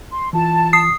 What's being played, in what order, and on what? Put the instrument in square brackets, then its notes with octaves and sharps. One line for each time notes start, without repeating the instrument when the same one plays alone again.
[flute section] C6
[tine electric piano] E3 F4 [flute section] A5
[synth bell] D#6 C7